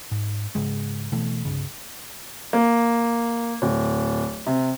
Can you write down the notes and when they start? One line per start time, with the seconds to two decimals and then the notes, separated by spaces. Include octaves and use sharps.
0.11 G#2
0.55 G#2 C#3 G#3
1.12 B2 E3 A3
1.45 C2 G2 C#3
2.53 A#3
3.62 D1
4.46 C3